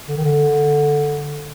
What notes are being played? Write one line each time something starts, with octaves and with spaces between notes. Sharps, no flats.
D3
D#3
D3